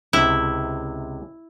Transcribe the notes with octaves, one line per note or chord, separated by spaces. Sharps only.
C#2 C3 E4